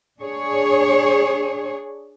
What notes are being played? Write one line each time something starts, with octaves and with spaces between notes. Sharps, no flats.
D4 G#4 C#5